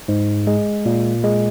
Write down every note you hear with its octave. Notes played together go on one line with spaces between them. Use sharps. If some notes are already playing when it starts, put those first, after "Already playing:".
G#2
G#3
A#2
G#3